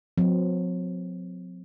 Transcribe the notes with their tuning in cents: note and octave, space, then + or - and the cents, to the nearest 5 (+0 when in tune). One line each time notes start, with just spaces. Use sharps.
F#3 -45 C4 -35